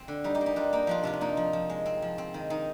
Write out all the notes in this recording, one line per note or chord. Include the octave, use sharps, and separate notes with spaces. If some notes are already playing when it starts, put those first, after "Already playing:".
Already playing: C4
D3
G3 D#4
D#4 G4
A#3
D#4 G4
G3 D4 F4
A#3 D#4
F3 D4 F4
C3 D4 F4
F4
A#3 D#4
F3
F3
G#3
C4
F3
C4
D#3
D#3 D#4